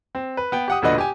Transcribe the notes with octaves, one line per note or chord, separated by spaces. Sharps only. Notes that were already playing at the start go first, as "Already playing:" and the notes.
C4
B4
B3 G5
G4 F#5 D#6
E1 A#2 D3 F#4 B4 D#5
G4 G#5